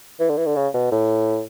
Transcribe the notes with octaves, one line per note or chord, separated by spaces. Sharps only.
E3
D3
E3
D3
C#3
B2
A2